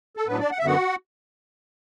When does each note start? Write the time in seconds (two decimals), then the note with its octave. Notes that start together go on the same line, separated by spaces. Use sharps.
0.17 A4
0.27 A2 F#3 B3 D4 B4
0.39 D4 D5
0.51 F#5
0.59 E5
0.63 F#2 D3 B3 F#4 F#5